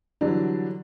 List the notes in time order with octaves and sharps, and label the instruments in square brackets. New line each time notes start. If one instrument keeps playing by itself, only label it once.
[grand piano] D3 E3 F#3 G3 D4